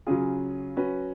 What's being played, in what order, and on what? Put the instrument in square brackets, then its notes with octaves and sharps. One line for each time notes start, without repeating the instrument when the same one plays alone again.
[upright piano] C#3 F#3 C#4 F4 G#4
F#3 C#4 F#4 B4